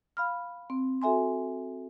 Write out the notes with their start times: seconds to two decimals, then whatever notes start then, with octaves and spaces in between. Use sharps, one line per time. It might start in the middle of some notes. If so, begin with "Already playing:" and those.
0.17 F5 B5 F6
0.70 C4
1.02 F#4 A4 E5 G#5 C6